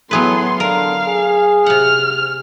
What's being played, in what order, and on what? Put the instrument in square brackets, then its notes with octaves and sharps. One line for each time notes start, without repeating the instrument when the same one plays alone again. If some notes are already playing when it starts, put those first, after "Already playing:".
[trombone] A2 [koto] F#3 G#4 B4 [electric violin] B3 C6
[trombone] D3 [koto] A#4 [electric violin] F5
[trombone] G#4
[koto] C3 F#5 [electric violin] F6